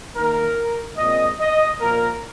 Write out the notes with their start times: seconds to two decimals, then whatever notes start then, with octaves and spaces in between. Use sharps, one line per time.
0.16 D#3 A#3 A#4
0.98 A#2 G#3 C4 D#5
1.40 D#5
1.80 A#2 F3 A#3 A#4